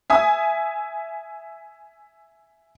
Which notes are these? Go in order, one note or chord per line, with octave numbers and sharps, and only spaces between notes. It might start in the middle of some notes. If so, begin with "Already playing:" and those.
E5 G#5 D#6